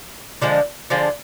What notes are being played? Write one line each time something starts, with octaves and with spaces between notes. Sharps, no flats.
D3 F3 G#3
D3 F3 G#3